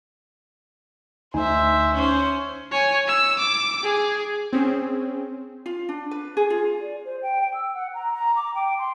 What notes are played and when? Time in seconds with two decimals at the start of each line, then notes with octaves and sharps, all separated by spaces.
1.34 D2 D#4 C5 E5 G#5
1.94 C#4 C5
2.72 C#5 G#5
3.07 E6
3.39 D6
3.83 G#4
4.53 C4 C#4 G#4
5.66 F4
5.89 D4
6.11 B4
6.37 G#4
6.50 F4
6.80 D5
7.05 C5
7.22 G5
7.42 G5
7.54 E6
7.74 F#5
7.94 A#5
8.14 A#5
8.36 D6
8.55 G5
8.78 C6